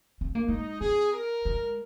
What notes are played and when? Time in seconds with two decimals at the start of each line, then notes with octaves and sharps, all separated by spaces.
0.21 C4
0.35 A#3
0.48 G#3 D#4
0.81 C4 G#4
1.13 A#4
1.45 G#3